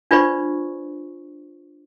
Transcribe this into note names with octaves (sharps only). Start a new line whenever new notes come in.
D4 F4 B4 C5 D5 C#6